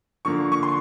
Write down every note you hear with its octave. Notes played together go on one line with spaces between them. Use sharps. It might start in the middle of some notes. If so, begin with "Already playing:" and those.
D3 F3 A#3 C#6
C#6
C6